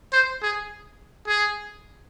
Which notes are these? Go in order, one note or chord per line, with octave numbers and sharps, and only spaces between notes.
C5
G#4
G#4